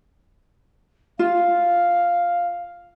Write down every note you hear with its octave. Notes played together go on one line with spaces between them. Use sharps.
F4 F5